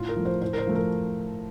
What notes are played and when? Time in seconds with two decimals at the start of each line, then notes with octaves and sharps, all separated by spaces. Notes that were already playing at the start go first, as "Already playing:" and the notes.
Already playing: A2 F4
0.09 A#4
0.16 F3 A3
0.25 C5
0.42 A2 C5
0.53 A#4
0.58 C5
0.67 F3 A3
0.75 A#4